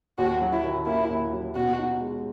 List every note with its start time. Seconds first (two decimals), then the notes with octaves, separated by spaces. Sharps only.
0.18 D#2 F#4
0.41 F#3
0.52 E4
0.64 D#3
0.86 A#3 E4
1.10 D#2
1.32 F#3
1.55 B2 F#4
1.78 D#4
2.00 G#3